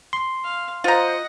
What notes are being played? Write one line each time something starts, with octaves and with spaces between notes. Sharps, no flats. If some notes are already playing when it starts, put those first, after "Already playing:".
C6
F5
F4 C5 D#5 F#5 A#5